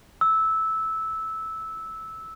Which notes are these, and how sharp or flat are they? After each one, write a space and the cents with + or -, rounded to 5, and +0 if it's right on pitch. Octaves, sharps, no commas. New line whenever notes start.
E6 -15